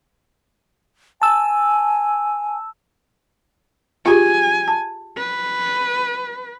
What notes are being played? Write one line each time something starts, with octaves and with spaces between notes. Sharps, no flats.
G#5 A5 E6
F4 G4 G#4 G#5
A5
B4